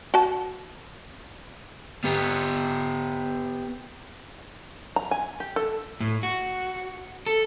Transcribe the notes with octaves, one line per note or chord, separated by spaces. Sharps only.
F#4 A5
B3 G4
A#5
G#5
G4
A4
A2
F#4
A4